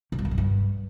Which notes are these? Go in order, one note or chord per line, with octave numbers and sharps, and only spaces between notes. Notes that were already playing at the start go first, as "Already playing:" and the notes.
C3
G2
F#2
B2
G2